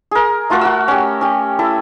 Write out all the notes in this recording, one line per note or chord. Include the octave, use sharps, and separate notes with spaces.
G#4 A#4
A3 F4 F#4 A#4
F#4 F#5 E6
C#4 G4
C#4 G4
E4 A4